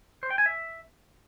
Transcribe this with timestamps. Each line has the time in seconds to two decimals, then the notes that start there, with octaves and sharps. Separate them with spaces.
0.23 C5
0.30 G5
0.38 G#5
0.46 E5